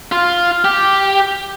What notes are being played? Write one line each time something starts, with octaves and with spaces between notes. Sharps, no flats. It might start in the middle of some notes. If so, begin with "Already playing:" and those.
F4
G4